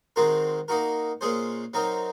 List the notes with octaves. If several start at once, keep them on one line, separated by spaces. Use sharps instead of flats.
D#3 G#3 C4 F#4 A#4
A#3 D#4 F#4 A#4
A#2 G#3 C#4 G#4 C5
F#3 C4 D#4 A#4